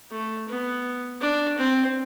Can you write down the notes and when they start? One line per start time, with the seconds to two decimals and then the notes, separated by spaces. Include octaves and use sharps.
0.11 A3
0.48 B3
1.21 D4
1.58 C4